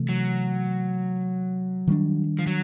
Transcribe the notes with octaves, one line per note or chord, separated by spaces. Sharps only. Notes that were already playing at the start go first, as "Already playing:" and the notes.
Already playing: C3 E3 A3
F#3
D#3 G3 B3 D4
F3
F#3